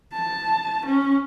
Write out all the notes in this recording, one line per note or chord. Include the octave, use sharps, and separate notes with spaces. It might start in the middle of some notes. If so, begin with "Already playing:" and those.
A5
C#4